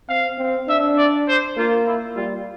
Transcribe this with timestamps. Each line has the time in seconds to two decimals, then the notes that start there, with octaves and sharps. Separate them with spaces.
0.09 C4 F5
0.38 C4
0.68 D4 E5
0.97 D5
1.28 C5
1.57 A#3 F4
1.86 E4
2.16 G3 F4